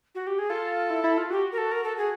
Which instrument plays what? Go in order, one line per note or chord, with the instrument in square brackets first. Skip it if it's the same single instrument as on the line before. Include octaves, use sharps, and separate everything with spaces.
[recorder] F#4
G4
G#4
[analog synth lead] F4 [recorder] A4
[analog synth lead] E4
E4
F4
[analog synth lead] F#4 [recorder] G4
[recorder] A#4
A4
A#4
A4
G#4